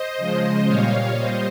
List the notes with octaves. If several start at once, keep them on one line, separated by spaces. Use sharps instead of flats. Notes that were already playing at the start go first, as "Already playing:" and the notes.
Already playing: C5 D#5
C#3 F3 G#3
A#2 G3 C#5 F5
G3 C5 D#5